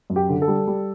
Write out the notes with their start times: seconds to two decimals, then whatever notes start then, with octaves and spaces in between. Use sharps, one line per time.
0.10 F#2
0.16 G4
0.29 D3
0.42 A4
0.48 G3
0.67 G3